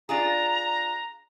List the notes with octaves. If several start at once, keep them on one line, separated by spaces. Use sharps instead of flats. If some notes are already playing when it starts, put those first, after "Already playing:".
D4 F4 G#4 A#5